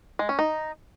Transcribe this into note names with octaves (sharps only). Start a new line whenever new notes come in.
G#3
C#4
D#4